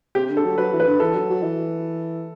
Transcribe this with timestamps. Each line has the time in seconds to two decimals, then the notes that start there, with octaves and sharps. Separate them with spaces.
0.15 C3 G4
0.29 D3
0.37 A4
0.44 F#3
0.58 F#3 B4
0.72 E3
0.80 B4
0.87 D3
1.00 E3 A4
1.15 F#3
1.29 F#3
1.42 E3